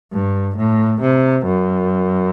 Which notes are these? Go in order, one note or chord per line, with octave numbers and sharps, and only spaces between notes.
G2
A2
C3
F#2